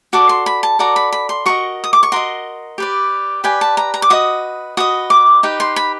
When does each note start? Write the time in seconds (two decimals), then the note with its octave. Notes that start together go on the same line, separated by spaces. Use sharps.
0.13 F#4 A4 D5 D6
0.29 C6
0.46 B5
0.63 A5
0.79 F#4 A4 D5 A#5
0.96 B5
1.12 B5
1.29 C6
1.46 F#4 A#4 D#5 C#6
1.84 D#6
1.93 D6
2.03 C#6
2.12 F#4 A#4 D#5 C6
2.78 G4 B4 D5
3.44 G4 B4 D5 G#5
3.61 A5
3.77 A#5
3.94 A#5
4.02 D6
4.10 F#4 B4 D#5 D#6
4.77 F#4 B4 D#5 D#6
5.10 D6
5.43 D#4 G4 B4
5.60 C6
5.76 B5